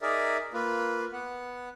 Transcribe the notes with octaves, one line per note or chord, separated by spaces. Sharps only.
D#4 G#4 A#4 D5 E5
A#3 F4 B4
B3 F#5